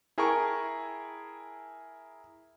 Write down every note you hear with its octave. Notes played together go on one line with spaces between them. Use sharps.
E4 G#4 A#4 G5 A5 C#6